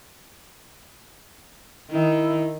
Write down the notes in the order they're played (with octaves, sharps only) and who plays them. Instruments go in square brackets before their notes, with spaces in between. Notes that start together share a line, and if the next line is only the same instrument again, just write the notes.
[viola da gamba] D#3 [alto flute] E4